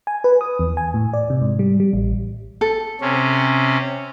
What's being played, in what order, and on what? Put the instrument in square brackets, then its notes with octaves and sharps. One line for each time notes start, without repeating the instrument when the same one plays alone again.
[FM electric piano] G#5
B4
D#6
E2
G#5
A2
D5
C3
G#2
G3
G3
A1
[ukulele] A4
[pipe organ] C3 C#4